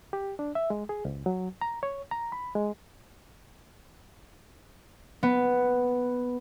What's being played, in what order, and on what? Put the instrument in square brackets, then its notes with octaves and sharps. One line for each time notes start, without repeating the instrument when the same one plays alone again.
[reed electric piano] G4
D4
E5
G#3
G#4
C#2
F#3
A#5
C#5
A#5
B5
G#3
[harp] B3